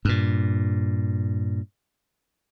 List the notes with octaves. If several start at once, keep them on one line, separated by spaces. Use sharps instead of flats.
G2 A#2